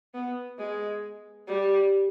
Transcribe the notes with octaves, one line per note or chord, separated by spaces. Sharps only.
B3
G#3
G3